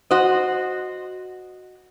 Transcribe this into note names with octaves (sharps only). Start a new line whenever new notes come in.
F#4 C5 D#5